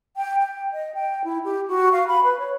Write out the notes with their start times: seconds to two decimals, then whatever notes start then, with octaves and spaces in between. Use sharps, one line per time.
0.17 G5
0.39 G5
0.73 D#5
0.94 G5
1.24 E4
1.44 G4
1.68 F#4
1.92 F5
2.07 B5
2.24 B4
2.39 C#5